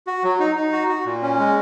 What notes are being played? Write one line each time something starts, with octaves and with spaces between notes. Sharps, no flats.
F#4
F#3
D#4
D#4
F#4
F#4
A#2
C#4
G#3